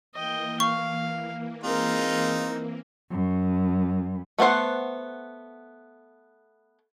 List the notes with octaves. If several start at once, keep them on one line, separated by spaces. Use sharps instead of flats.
E3 A#3 D#5 G5
F5 C#6
G#3 C4 D#4 F4 A#4
F#2
A3 B3 A4 C5 F#5